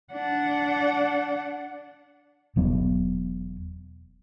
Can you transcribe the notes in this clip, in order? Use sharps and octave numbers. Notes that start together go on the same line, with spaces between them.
D4 F#5
E1 F#3 B3